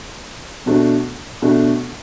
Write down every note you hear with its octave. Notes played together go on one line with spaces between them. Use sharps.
B2 A3 D4 F#4
B2 A3 D4 F#4